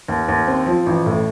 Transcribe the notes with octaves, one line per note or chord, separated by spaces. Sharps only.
D#2
D#2
C4
F3
A1
A2